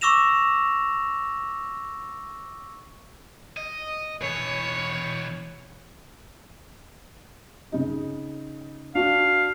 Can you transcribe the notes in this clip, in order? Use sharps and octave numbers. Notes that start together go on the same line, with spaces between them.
C#6 D6 E6 A#6 E7 F7
D#5
B2 E3 C#5
C#3 D#4
D4 F#4 F5